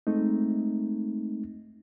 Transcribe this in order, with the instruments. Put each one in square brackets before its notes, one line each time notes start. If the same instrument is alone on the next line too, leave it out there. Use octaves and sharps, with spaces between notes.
[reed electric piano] G#3 A3 C4 D#4